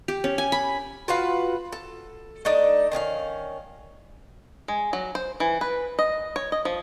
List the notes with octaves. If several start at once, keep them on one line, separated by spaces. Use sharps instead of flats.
G4
C#4
G#5
B5
F4 F#4 B4 F5
A4
A3 D4 D#4 D5
D#3 C#4 D#4 F5
G#3
F#3
C5
E3
B4
D#5
C#5
D#5
F3